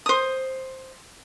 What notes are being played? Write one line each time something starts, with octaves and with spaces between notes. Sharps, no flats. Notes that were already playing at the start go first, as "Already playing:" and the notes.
C5 D#6